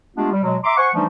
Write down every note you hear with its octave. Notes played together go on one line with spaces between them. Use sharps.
G#3 A3 B3 D4 F4 G4
G3
B2 F#3 G#3
E5 A#5 C6 D6
C5 F#5 G#5 C#6
E3 F3 G3 A3 D4 D#4